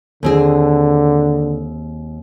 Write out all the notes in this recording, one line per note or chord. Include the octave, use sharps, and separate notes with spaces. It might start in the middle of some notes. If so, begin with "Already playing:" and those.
D#2 D3 C4 G#4